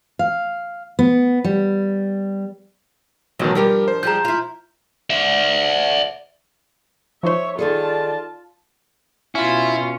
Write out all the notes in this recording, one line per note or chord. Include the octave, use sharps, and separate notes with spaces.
F5
B3
G3
A1 B2 D#3 F#3
G2 F3 G3 G4 A#4
C5
F3 G3 G#3 A#5 G6
E4 F4
D5 E5
F3 D#4 C5 C#5 E5
D#3 F4 G#4 A4 D5 A5
B2 C#4 E4 F4